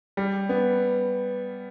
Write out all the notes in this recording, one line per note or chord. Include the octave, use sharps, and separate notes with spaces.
G3
B3